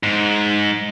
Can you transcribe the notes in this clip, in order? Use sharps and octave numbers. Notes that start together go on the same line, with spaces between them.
G#2